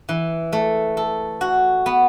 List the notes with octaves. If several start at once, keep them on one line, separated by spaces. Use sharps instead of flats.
E3
A3
A4
F#4
B3